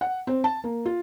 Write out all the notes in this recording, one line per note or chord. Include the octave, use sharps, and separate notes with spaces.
F#5
C4
A5
A#3
F4